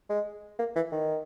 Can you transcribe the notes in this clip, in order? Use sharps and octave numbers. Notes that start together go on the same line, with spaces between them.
G#3
A#3
E3
D#3